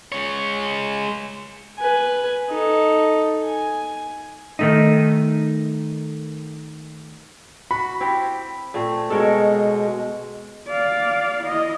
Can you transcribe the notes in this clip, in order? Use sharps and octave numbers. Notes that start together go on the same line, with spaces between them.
G#3 C#5
B4 G#5
D#4 A4
G#5
D#3 A3 D#4
F#4 B5
C4 E4 G4
A#2 A3 C4
B2 G#3 A4 A#4 C#5
D5 F5
E4 D#5